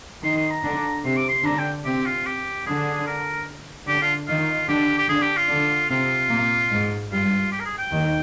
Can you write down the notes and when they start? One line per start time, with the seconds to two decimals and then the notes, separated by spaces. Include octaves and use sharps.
0.24 D#3 D#4 C6
0.37 C6
0.51 A#5
0.64 D3 D4
1.05 C3 C4 C6
1.17 D6
1.29 C6
1.45 D3 D4 A#5
1.59 G5
1.85 C3 C4 G4
2.06 F4
2.26 G4
2.66 D3 D4 G#4
3.07 A#4
3.87 D3 D4 G4
4.02 F4
4.28 D#3 D#4 F4
4.69 D3 D4 G4
4.98 G4
5.09 D3 D4 G#4
5.22 G4
5.37 F4
5.49 D3 D4
5.90 C3 C4 F4
6.31 A#2 A#3
6.71 G#2 G#3
7.11 G2 G3 F4
7.52 G4
7.60 A#4
7.65 G#4
7.78 G5
7.92 D#2 D#3